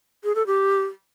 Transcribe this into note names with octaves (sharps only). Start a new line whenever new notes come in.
G#4
A4
G4